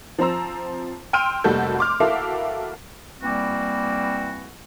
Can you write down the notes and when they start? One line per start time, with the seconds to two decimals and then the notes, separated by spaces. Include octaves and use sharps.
0.19 F3 C4 C5 A#5 E6
1.13 G5 C6 E6 F6 D7 D#7
1.44 F1 G3 A#3 F#4 A4 G6
1.78 C6 D6 F6
2.00 E4 F#4 A4 A#4 E5 F5
3.21 E3 G3 A#3 C4 F#4